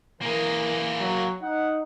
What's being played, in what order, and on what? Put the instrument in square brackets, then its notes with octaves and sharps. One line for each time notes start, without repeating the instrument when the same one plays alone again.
[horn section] E3 [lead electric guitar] A#3 G#4 [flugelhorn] A#4
[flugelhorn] F#3
[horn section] D#4 [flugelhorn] F#5